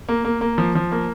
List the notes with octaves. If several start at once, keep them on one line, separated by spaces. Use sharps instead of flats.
A#3
A#3
A#3
F3
F3
A#3